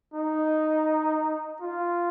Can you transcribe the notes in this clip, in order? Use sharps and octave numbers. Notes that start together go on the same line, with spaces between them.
D#4
F4